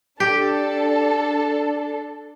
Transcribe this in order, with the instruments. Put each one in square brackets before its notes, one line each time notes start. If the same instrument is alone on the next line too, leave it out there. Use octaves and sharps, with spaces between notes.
[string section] D4 A4 [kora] G4